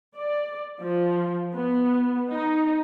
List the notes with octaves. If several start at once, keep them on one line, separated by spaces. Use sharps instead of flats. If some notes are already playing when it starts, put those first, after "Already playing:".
D5
F3
B3
D#4